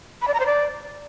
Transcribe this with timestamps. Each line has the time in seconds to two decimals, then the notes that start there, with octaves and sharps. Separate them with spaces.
0.22 B5
0.28 D5
0.34 A#5
0.40 C5
0.46 D5